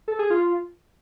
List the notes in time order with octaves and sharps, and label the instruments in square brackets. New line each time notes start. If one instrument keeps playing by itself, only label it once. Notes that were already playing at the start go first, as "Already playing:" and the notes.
[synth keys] A4
G#4
F4